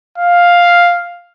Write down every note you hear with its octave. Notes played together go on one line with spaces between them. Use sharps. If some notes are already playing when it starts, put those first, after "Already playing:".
F5